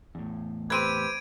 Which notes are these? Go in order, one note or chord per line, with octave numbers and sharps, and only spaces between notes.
E2 A2
C4 G4 B4 G#6 D7 D#7